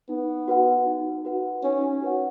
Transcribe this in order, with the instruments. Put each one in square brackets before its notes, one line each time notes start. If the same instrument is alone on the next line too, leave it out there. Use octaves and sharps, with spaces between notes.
[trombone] B3 [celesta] D#4
[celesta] F#4 B4 F#5
D#4
F#4 B4 F#5
[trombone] C#4 [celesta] D#4
[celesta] F#4 B4 F#5